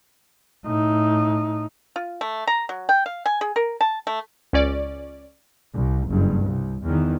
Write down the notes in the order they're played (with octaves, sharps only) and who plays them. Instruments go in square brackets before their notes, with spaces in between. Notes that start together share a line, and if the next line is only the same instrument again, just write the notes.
[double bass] A2 D#4
[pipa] F4
A3
A#5
F#3
G5
F5
G#5
G#4
A#4
A5
A3
[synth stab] C#2 C#4 D5
[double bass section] C2
F#1 G2
C2
E2 D#3